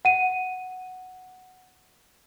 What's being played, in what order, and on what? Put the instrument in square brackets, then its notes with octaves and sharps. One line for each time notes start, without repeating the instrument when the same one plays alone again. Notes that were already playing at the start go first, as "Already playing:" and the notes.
[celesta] F#5 D#7